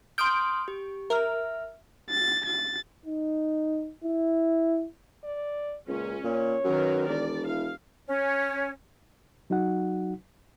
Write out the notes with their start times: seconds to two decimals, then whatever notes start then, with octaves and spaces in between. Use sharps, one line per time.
0.18 C6 D#6 F6 G6 D7
0.68 G4
1.10 A#4 E5 F6
2.10 A6
2.45 A6
3.06 D#4
4.04 E4
5.24 D5
5.88 C#2 A#2 C#4
6.24 A#2 C#5
6.65 F#2 D#3 A#4 B4
7.08 E1 D5
7.47 E4 F5
8.08 C#4
9.50 F#3 D#4 F#4 F#5